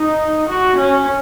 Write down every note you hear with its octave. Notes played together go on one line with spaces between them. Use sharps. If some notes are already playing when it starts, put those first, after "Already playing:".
Already playing: D#4
F#4
C#4